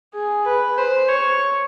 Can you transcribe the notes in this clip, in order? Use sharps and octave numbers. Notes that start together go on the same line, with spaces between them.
G#4
B4
C5
C#5